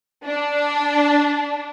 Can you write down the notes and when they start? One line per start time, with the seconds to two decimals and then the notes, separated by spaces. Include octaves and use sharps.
0.24 D4